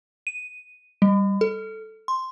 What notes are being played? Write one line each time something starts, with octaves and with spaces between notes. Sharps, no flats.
D#7
G3
A4
C6